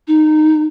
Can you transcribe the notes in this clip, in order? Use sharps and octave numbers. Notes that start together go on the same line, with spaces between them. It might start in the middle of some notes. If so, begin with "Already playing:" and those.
D#4